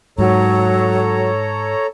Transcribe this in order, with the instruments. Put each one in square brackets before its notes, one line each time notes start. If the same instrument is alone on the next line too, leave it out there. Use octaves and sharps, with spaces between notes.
[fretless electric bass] G#2 [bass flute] F#3 [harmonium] A4 C#5 A#5